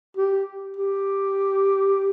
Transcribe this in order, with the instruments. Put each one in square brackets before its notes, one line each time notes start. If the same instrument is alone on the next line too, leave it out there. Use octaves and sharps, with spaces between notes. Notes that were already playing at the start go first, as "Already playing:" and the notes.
[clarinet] G4
G4